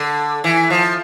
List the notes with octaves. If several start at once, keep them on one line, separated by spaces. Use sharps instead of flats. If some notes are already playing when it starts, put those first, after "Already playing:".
Already playing: D3
E3
F3